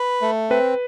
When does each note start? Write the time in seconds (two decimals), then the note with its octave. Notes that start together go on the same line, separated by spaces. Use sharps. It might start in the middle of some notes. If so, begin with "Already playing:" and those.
Already playing: B4
0.22 A3
0.50 C4 B4